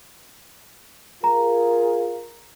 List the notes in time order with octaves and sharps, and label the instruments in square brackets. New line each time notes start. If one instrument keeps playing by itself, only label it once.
[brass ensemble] F4 G#4 A#4 [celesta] A#5